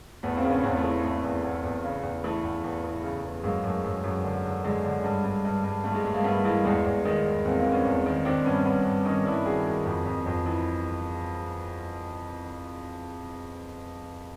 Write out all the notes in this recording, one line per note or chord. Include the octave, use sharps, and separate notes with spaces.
E2 A3 B3
A#3 C4
C#3
B3 C#4
E2 A#3 C4
A3 B3
E3
E2 A3
E2 A3
E2
E2
C#3
E2
E3 A3
E2
E2
E3
C#3
E2
F#2 G#3 A#3
F#2 A3
F#2
F#2
D3
D3
D3 G#3
D3
G2
G2
G2
G2
G2 A3
G#3
G2 A3
G#3 A#3
G2 A3 B3
E3 G#3 A#3
E2 G#3 A#3
E2
D#3 G#3 A#3
E2
E2 A#3 C4
A#3 C4
E2
B3 C#4
E2
D#3
D#3 C4 D4
G2 B3 C#4
G2 B3 C#4
G2
D#3 C#4 D#4
G2 D4 E4
D#3 F#4 G#4
D#3
F2
F2
F2
E3